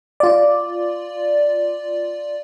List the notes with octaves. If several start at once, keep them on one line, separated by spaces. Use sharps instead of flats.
F4 D5